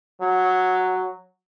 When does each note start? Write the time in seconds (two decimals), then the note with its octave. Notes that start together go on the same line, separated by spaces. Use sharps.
0.21 F#3